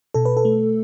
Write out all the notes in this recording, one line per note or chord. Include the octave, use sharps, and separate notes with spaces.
B2 A4
B4
A4
A3